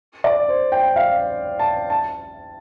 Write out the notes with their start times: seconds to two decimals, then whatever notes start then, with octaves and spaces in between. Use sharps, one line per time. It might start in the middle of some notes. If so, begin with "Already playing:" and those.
0.24 D5
0.48 C5
0.72 G5
0.96 F5
1.59 A5
1.90 A5